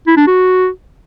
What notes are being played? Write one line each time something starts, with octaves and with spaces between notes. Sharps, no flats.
E4
D4
F#4